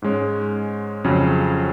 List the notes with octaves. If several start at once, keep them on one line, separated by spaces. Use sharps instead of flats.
G#2 G#3 C#4
F2 C#3 F#3 C#4